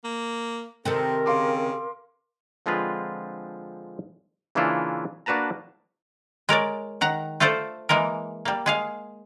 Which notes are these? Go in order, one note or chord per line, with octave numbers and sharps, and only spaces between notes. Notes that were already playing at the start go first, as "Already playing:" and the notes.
A#3
C3 D#3 C4 A4 A#4
C#3 F5 C6 D6
D3 F3 G#3 C4 F4 B4
C#3 E3 A#3 D4 E4 F4
A#3 D4 F#4 B4 A5 A#5
G#3 A#4 C#5 D5
D#3 F#5 A#5
A3 F4 A4 C5 D5
E3 G#3 A#3 A#4
G3 A#3
G#3 G#4 F5